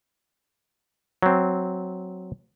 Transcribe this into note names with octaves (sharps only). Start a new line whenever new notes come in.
F#3 C4